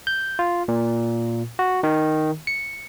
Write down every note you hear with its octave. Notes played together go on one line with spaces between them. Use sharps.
G6
F4
A#2
F#4
D#3
C#7